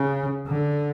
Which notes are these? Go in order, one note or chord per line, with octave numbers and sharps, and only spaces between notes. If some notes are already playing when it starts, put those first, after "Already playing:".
Already playing: C#3
D3